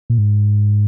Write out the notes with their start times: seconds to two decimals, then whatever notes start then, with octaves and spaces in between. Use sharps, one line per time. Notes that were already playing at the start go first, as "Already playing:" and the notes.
0.10 A#2
0.18 G#2